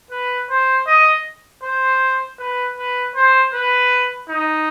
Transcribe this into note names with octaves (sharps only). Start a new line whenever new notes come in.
B4
C5
D#5
C5
B4
B4
C5
B4
D#4